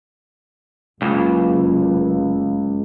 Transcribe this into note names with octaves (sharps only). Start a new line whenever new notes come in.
F#1 C#2